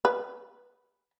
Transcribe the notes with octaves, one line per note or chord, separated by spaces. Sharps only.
B4